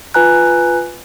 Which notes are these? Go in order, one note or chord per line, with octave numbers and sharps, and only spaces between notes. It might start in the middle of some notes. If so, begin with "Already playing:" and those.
F4 B4 G#5 A#5 F#6